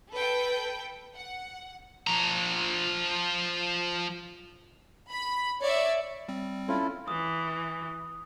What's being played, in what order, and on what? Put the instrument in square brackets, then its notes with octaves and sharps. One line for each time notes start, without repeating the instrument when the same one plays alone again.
[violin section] A4 B4 G5
F#5
[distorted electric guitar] F3 A#5
[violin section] B5
C#5 D5 E5
[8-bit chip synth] G3 C4
[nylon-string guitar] C#4 [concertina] E4 F4 A4
[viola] E3 [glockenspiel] D#6